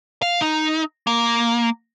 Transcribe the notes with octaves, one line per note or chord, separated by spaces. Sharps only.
F5
D#4
A#3